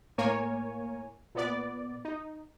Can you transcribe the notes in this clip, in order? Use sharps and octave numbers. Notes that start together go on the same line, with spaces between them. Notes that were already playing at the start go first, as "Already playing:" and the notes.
A2 A#3 A#4 C#5 G#5
A#2 B3 D5
D#4